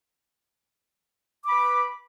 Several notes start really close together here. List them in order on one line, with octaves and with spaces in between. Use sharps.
D6 B5 B4